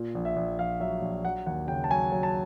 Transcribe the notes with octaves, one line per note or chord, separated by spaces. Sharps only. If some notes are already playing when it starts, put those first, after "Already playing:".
Already playing: A#2
A#1
E5
A#1
A#1 F5
F#3 E5
A#1
F#3 F#5
D#2 F#5
C#3 G5
A5
F#3 G#5
F#3
A5